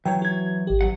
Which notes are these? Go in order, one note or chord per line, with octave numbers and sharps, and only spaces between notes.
E3 F#3 C#5 G5
F#4 G#6
G#1 G4
E2 F#3 F#5